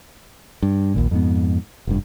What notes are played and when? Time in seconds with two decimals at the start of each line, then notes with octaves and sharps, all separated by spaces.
0.62 G2
0.94 A#1 D#2 A#2
1.11 F2 G#2 B3
1.87 F1 G2